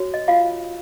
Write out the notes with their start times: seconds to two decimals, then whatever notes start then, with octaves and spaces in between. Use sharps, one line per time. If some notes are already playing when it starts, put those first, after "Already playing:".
Already playing: F#4 C#5
0.14 D#5
0.28 F4 F5